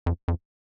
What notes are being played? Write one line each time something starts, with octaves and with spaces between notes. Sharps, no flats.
F2
F2